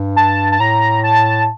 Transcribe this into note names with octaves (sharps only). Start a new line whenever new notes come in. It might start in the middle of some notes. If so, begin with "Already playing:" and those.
Already playing: G2
A5
A5
A2 A#5
A5